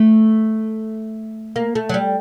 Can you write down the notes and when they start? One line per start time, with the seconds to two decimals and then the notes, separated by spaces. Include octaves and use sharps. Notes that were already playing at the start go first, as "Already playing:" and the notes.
Already playing: A3
1.56 A#3
1.75 A3
1.89 F#3
1.94 G3